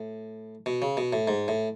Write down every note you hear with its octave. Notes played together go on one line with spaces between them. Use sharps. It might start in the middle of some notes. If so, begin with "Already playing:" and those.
Already playing: A2
B2
C#3
B2
A2
G#2
A2